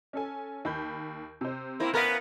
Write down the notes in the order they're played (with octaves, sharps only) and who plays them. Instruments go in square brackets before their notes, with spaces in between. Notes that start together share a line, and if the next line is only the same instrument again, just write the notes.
[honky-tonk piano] C#4 A4 G#5
D#2 B5 G6
C3 C5
[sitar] A#3 C4 E4
[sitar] B3 A#4 [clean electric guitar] C#4 B4 [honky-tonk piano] F5 F#6